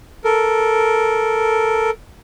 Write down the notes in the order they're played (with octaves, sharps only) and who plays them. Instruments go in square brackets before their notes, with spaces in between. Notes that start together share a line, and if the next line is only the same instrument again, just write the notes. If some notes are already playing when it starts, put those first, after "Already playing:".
[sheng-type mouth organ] A4 A#4